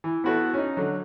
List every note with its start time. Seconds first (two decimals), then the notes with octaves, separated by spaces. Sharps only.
0.04 E3
0.24 B3 E4 F#4 A4 B4
0.54 C#4 D#4
0.77 D3 F#3